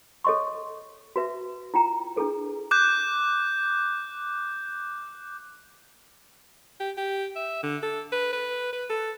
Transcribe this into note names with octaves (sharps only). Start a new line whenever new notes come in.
A4 C#5 D#5 C6 C#6
F#4 B4 E5
E4 F4 G5 A#5
D4 E4 G#4 A4 B4
D6 F#6 G6
G4
G4
E5
D3
A4
B4
B4
B4
A4